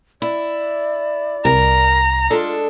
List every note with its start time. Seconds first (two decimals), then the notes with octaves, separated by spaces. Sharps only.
0.22 E4 D5
1.45 C2 A#4 A#5
2.30 G#3 D4 F4 A4